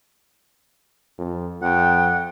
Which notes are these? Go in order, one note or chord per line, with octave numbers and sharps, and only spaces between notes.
F2
F2 F#5 G5